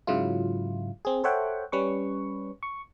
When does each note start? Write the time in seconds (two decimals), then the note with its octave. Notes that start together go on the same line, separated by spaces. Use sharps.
0.07 G#2 C#3 F#3 G#3 E4 F4
1.05 C4 G#4
1.24 A4 C5 C#5 E5 F#5 G5
1.72 G3 C#4 B4 C#6
2.63 C#6